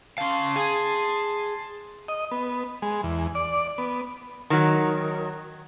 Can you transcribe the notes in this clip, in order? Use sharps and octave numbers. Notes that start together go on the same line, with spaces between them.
C#4 F5 A5 C6
G#4
D#5
B3
G#3
E2
D5
B3
D#3 F#3